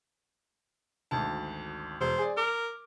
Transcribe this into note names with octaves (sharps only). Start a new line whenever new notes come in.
G#1 D2 A5
E1 C5
G#4 D5
A#4 D6